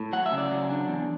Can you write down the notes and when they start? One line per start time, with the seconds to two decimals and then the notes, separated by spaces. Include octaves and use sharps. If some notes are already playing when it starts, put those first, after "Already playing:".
Already playing: A2
0.13 F#3 F#5
0.26 E5
0.32 C#3
0.38 D5
0.51 F#3
0.70 D4
0.88 E2